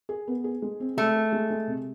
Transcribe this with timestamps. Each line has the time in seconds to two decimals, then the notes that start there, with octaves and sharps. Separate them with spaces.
0.09 G#4
0.28 B3
0.44 G#4
0.62 G#3
0.80 C4
0.97 G#3 A3
1.15 G#4
1.33 G#3
1.50 G#3
1.67 C3